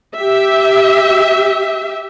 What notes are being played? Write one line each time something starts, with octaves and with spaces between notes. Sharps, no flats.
G4 E5